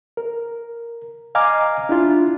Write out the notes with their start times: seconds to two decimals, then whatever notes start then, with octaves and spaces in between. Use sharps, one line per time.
0.17 A#4
1.35 D#5 F5 G#5 A#5 D6 F6
1.89 D4 E4 F4